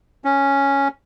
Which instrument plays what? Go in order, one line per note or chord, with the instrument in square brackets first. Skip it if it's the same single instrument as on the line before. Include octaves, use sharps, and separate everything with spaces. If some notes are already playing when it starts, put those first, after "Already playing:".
[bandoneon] C#4